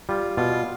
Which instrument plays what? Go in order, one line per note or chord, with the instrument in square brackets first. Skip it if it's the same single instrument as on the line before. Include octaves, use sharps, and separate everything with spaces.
[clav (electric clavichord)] G3 [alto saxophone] F4
[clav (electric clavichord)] B2 [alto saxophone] F4